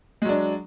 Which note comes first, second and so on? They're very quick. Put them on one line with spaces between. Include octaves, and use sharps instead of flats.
G#3 F#3 D4